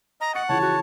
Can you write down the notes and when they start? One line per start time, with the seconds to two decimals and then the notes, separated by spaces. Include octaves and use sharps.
0.21 D#5 A#5
0.35 F#5 C#6 A6 C#7
0.49 C#3 E3 F3 C#5 A5
0.61 F#4